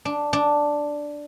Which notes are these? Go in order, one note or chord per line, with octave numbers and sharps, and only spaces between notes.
D4
D4